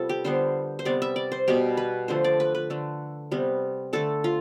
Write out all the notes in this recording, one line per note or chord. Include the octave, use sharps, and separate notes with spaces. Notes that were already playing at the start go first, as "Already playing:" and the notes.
Already playing: C3 G3 B3 F4 A4
G4
D3 G3 B3 C5
C5
C3 G3 B3 D5
E5
D5
C5
B2 G3 B3 G4
B4
D3 F3 A3 C5
D5
B4
B4
D3 A3
C3 G3 B3
D3 A3 A4
F4